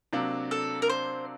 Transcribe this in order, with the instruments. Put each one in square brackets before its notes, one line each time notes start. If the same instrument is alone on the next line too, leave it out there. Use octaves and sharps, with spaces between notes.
[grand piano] C3 F#3 A#3 D4
[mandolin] A4
A#4
C5